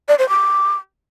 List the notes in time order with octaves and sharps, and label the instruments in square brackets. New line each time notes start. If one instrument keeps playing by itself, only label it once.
[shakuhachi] D5
C5
D6